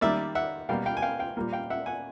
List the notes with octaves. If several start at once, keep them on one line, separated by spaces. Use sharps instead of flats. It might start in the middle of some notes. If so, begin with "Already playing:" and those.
D#3 G3 A#3 D5 E5
E5 F#5
B2 G3 A#3 F5 G5
F5 G5
G#5
F5 G5
F5 G5
A#2 G3 A#3
F5 G5
E5 F#5
F#5 G#5